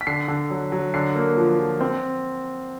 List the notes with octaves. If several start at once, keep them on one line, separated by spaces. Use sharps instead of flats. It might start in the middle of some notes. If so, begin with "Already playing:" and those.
B6
D3 C7
D3
F#3
F#3
D3 C7
A#3
F3
F3
C4